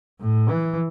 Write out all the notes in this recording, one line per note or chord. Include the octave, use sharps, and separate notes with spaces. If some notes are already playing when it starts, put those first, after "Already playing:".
A2
E3